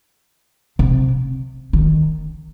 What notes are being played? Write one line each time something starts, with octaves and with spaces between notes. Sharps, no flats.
C3
D#3